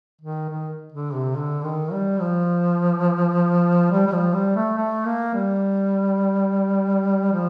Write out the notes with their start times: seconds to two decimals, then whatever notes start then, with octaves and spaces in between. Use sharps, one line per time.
0.21 D#3
0.50 D#3
0.92 D3
1.14 C3
1.36 D3
1.64 D#3
1.92 G3
2.20 F3
3.91 G3
4.06 G3
4.13 F3
4.34 G3
4.56 A3
4.77 A3
5.06 A#3
5.34 G3
7.33 F3